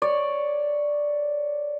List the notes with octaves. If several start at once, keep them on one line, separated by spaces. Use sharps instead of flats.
C#5 D5